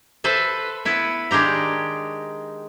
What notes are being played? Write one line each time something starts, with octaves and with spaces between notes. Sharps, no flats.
A4 B4 C5 E5
B3 E4 B4
D#3 G#3 D4 G4 A#5